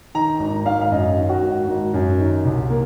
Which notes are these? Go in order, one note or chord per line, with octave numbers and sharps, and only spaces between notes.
D#3 A#5
G#1
G#1 F5
F5
F#2 D#5
D#3
F#4
G#1
G#1
F#2
D#3
C2
A#3